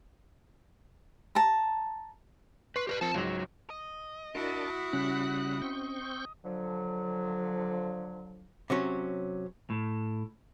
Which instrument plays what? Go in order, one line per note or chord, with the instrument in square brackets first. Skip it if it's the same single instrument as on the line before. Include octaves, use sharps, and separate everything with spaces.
[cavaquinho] A5 A#5
[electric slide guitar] B4 [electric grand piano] C6 C#6 C7
[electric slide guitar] G4 A#4 B4
[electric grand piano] F3 C4 [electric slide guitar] A#4 A5
[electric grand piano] C#2 G#2 [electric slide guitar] F#3
[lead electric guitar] D#5
[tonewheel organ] D4 A#4 A5 [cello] E4 F#4
[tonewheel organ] C#3 G3 F#6 [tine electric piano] C#4
[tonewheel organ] C4 C#6 G6
[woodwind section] D3 F3 F#3
[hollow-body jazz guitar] C3 F#3 C#4
[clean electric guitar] A2